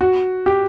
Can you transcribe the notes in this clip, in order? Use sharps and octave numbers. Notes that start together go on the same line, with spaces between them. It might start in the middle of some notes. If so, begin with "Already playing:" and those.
F#4
G4